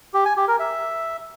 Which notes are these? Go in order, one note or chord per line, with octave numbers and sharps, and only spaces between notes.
G4
G#5
G4
A#4
E5